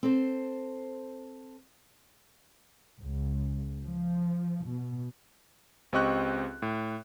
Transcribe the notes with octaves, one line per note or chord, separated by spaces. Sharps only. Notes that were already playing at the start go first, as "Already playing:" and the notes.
C4 A4 C5
C#2
F3
B2
C#2 C4 G4 D#5 C#6 F#6
A2